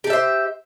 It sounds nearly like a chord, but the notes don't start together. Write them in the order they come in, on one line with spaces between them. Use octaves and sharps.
G4 A4 E5 C5